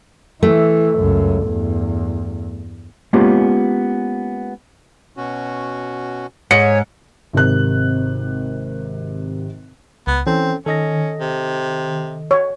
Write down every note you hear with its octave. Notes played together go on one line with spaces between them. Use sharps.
E3 A3
C#2 F#2
E2 G2
G#3 A#3 B3 C#4 F4 G4
B2 C#4 F#4
G#2 C#5 G#5 C#7
G#1 C3 A#4 F#6
C#2 B3
E3 C4 C#4 A4
D#3 C#4 A4 D#5 A#6
C3
C#5